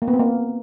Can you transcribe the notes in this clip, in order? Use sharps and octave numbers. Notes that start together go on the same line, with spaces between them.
A#3
B3
C4
A#3